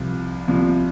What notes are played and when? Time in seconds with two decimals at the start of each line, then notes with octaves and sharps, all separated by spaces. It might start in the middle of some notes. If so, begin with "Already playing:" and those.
Already playing: C2 C3 F3
0.48 C2 C3 F3